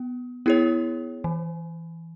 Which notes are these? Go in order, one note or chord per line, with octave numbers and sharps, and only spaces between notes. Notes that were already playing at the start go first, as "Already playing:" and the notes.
Already playing: B3
B3 E4 G#4 C#5
E3